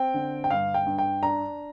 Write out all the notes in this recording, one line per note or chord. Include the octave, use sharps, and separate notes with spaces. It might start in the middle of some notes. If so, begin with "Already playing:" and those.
Already playing: C4 G5
D3
G5
G2 F5
G5
G2
G5
D4 A#5